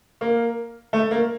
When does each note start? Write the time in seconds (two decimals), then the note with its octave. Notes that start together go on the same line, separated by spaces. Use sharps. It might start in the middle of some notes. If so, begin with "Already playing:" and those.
0.21 A#3
0.93 A3
1.11 A#3